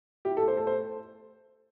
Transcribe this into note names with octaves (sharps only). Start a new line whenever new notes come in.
E4 G4
A4
A3
C5
A3 A4
C5